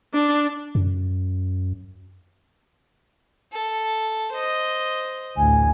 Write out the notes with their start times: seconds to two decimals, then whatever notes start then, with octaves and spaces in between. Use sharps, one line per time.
0.14 D4
0.75 F#2
3.52 A4
4.33 C5 D#5
5.37 A1 D2 G#5